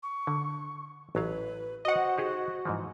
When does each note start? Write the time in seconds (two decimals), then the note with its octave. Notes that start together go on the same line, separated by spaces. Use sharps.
0.03 C#6
0.27 D3
1.15 A1 F#3 B4 F5
1.85 F#4 C5 D#5 F#5
2.18 D#4 G4 G#4
2.65 G#2 E3 F3